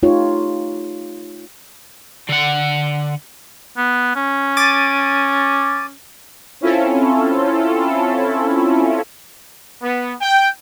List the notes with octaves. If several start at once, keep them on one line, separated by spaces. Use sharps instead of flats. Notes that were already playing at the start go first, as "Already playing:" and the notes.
A3 D#4 F4 G4 C#5
D3 F#5
B3
C#4
D6 A6 D#7
C4 C#4 E4 F4 A4
B3
G5